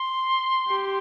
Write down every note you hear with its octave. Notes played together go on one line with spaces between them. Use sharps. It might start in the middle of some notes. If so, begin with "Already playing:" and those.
Already playing: C6
G4